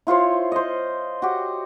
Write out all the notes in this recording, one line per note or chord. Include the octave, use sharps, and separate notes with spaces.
E4 F4 C5 C#5
C5 D#5
F#4 G4